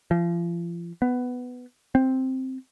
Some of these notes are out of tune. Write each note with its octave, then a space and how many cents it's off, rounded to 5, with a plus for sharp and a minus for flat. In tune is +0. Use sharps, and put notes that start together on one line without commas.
F3 -35
B3 +10
C4 +0